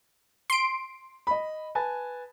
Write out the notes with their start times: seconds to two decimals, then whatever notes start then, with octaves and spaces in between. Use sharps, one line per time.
0.50 C6 D7
1.27 D#5 B5
1.75 B4 G#5 A5